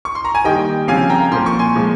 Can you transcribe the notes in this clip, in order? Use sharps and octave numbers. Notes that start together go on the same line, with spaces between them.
C#6
C6
A#5
G#5
D#3 G3 A#3 D#5 G5
C#3 F3 C4 F5 G#5
G5 A#5
A#2 F3 A#3 C6
C#6
G#5 C6
A#2 F3 G#3